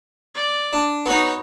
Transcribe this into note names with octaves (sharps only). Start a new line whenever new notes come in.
D5
D4
B3 D#4 F#4 C#5